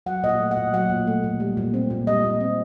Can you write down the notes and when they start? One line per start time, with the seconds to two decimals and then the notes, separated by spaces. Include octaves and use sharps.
0.06 F#3 F#5
0.23 A#2 D#5
0.29 F#5
0.40 A3
0.51 F#5
0.57 A#2
0.73 F#3 F#5
0.90 A#2
1.07 A3
1.24 A#2
1.40 G3
1.57 A#2
1.74 C4
1.90 A#2
2.07 G3 D#5
2.24 A#2
2.40 C4